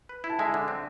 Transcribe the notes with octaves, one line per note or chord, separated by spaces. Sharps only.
B4
E4
A5
G#3 E5 G#5
D3
C4